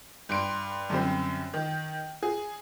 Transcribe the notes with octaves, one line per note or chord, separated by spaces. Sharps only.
G2 C6 D7
F#2 D3 G3 C4
D#3
G#4